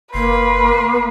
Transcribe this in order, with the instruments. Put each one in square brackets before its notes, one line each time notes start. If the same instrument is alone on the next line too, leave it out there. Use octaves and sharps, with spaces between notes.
[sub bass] F#1 [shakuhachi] A#3 [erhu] B4 [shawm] C6